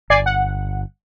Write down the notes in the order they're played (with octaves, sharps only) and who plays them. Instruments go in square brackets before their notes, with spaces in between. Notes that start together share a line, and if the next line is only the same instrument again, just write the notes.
[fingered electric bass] G1 [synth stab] D5 G#5 C7
[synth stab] F#5